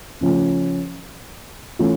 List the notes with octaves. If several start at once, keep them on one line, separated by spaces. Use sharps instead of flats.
C#3 F3 A3 C#4
E3 A3 C#4 F4